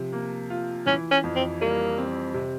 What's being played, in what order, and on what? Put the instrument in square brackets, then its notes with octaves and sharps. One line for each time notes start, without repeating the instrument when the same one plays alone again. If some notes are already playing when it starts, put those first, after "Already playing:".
Already playing: [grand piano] C3 F3
A#3
F4
[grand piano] E3 [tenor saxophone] C#4
[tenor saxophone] C#4
[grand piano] F2
[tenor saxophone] C4
[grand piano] G3 [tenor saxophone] A#3
[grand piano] C4
C3